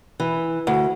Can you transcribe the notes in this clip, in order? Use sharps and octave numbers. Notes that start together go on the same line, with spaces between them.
E3
D2